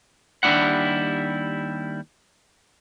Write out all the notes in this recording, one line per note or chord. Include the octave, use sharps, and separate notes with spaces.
D#2 G3 C#4 D4 E4 F#5